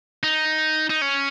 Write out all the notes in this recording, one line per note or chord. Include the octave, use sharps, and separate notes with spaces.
D#4
D#4
C#4